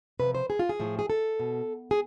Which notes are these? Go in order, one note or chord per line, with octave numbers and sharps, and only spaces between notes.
C3 F3 B4
C5
G#4
F4
G#4
A2 F3
G#4
A4
B2
G#4